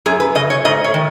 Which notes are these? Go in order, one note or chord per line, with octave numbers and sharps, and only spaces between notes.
F#2 G#4
B4
C#3 D#5
C#5
G#2 D#5
C#5
D#3